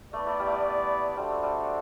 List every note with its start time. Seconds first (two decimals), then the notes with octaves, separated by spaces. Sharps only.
0.13 A3 B3 E4 B4 D5
0.27 A3
0.39 G3
0.46 A3
0.53 G3
1.16 G3 D4 F#4 A4 C5 E5
1.30 A3
1.43 G3